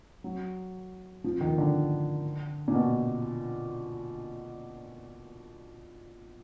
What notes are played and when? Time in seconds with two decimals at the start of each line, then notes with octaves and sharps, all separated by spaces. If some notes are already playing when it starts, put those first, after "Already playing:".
0.24 F#3
1.24 F3
1.41 D#3
1.58 D3
2.68 A#2
2.74 B2